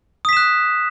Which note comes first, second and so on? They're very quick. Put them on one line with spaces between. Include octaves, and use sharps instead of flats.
D#6 B6 E7 F#6